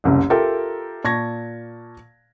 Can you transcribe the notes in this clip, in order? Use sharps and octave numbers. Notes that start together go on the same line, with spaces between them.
F#1 C2 F#2
F4 G4 A4 A#4 E5 G5
A#2 A5 C#6 G#6 A#6